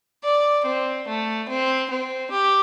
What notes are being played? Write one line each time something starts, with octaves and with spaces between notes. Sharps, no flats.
D5
C4
A3
C4
C4
G4